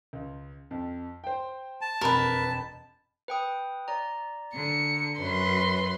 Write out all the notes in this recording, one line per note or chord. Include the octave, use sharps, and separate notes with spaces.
C#2
F2
C5 G5
A5
E1 F2 A#4 B4 B5
B4 G5 D#6
D5 A#5
D3 C#7
F#2 B4 C6